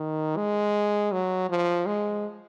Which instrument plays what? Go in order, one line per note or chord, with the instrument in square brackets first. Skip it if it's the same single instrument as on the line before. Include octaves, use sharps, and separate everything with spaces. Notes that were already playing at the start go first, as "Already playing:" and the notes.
Already playing: [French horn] D#3
G#3
F#3
F3
G#3